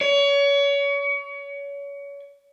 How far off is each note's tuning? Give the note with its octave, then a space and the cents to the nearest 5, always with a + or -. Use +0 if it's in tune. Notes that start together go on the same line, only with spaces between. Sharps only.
C#5 +30